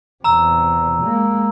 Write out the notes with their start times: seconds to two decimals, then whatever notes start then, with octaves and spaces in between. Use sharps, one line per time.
0.24 E2 C3 A#5 E6
1.02 G#3 A#3